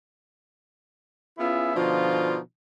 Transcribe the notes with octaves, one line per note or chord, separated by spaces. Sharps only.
B3 C#4 E4 F4 G#4 E5
B2 D3 F3 D4 D#4 F4